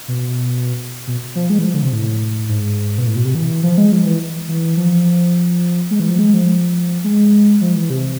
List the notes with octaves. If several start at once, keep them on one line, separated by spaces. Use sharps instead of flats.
B2
B2
F3
G#3
E3
F3
D3
C3
A2
G#2
B2
A2
B2
C3
E3
F3
G#3
F3
E3
E3
F3
G#3
E3
F3
G#3
F3
G#3
F3
E3
C3